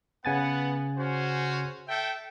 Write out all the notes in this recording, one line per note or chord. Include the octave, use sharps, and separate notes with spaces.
C#3 B3 F#5 G#5 A6
C#4 F#4 C5
A4 E5 G5